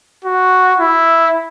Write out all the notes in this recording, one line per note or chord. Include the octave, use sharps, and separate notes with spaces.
F#4
E4